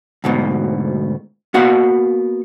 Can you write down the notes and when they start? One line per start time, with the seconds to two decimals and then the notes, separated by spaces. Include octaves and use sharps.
0.24 D2 G#2 B2
1.54 A#3 B3 F#4 F5 F#5